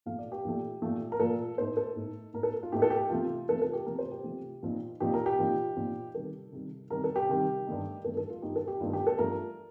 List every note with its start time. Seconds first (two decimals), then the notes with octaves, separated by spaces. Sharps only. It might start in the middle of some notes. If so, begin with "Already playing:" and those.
0.06 A#2 F3 A3 F5
0.19 D5
0.32 G4
0.45 A#2 F3 A3
0.82 A#2 F3 A3
1.12 A#4
1.20 A#2 F3 A3 A4
1.58 A2 A3 D#4 C5
1.77 A4
1.96 A2 A3 D#4
2.34 A2 A3 D#4 A#4
2.43 A4
2.63 F4
2.72 A2 A3 D#4 G4
2.82 A4
2.90 G4
3.10 C3 F3 A3 F4
3.48 C3 F3 A3 A4
3.62 A4
3.73 G4
3.86 C3 F3 A3 A#4
3.99 C5
4.11 G4
4.24 C3 F3 A3
4.63 A#2 F3 C4 D#4
5.00 A#2 F3 C4 D#4 G4
5.14 A#4
5.26 G4
5.38 A#2 F3 C4 D#4
5.76 A#2 F3 C4 D#4
6.14 C3 D#3 G3 A4
6.52 C3 D#3 G3
6.90 C3 D#3 G3 A#4
7.04 A4
7.16 G4
7.29 C3 D#3 G3
7.67 G2 D#3 A3 D#4
8.04 G2 D#3 A3 D#4 A4
8.17 A4
8.30 F4
8.42 G2 D#3 A3 D#4 G4
8.56 A4
8.68 G4
8.80 G2 D#3 A3 D#4 F4
8.93 G4
9.07 A4
9.18 G2 F3 A3 A#4